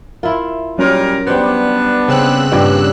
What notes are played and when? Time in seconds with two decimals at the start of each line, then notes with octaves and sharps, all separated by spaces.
0.23 E4 F4 A#4 E5
0.78 A#2 F#3 G3 C#4 A#4
1.27 G3 B3 D4 C5
2.08 C#3 C4 E6 F#6
2.51 G2 A#2 B4 D5 F#5 G5